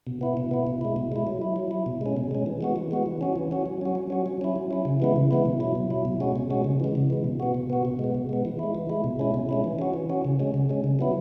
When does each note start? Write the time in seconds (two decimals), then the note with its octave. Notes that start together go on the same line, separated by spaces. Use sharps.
0.07 B2
0.21 B3 E4
0.37 B2
0.51 B3 E4
0.67 B2
0.81 G#3 E4
0.96 B2
1.12 G#3 E4
1.27 F#3
1.42 E4
1.56 F#3
1.71 E4
1.86 B2
2.01 G#3 C#4
2.17 B2
2.31 G#3 C#4
2.46 E3
2.61 G#3 B3 F#4
2.76 E3
2.91 G#3 B3 F#4
3.06 E3
3.21 C#4 F#4
3.36 E3
3.51 C#4 F#4
3.66 F#3
3.81 C#4 F#4
3.95 F#3
4.10 C#4 F#4
4.26 F#3
4.41 C#4 E4
4.56 F#3
4.71 C#4 E4
4.85 C#3
5.00 E3 G#3 B3 E4
5.16 C#3
5.31 E3 G#3 B3 E4
5.45 B2
5.60 F#3 E4
5.75 B2
5.90 F#3 E4
6.05 B2
6.20 G#3 C#4 F#4
6.36 B2
6.50 G#3 C#4 F#4
6.64 C#3
6.80 E3 G#3
6.95 C#3
7.10 E3 G#3
7.24 B2
7.40 B3 F#4
7.55 B2
7.70 B3 F#4
7.85 B2
7.99 G#3 B3
8.15 B2
8.29 G#3 B3
8.45 E3
8.59 G#3 E4
8.75 E3
8.89 G#3 E4
9.04 B2
9.19 G#3 C#4 E4
9.34 B2
9.49 G#3 C#4 E4
9.64 E3
9.79 C#4 F#4
9.94 E3
10.10 C#4 F#4
10.25 C#3
10.40 G#3 C#4
10.54 C#3
10.69 G#3 C#4
10.84 C#3
10.99 F#3 B3 E4